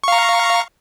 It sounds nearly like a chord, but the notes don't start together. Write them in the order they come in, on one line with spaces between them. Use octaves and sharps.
C#6 F5 A#5